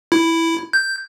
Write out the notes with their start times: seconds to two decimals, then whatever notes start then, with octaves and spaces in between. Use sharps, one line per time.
0.12 E4
0.73 G6